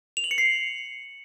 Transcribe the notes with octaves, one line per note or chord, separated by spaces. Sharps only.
F7
F#7
C#7
C7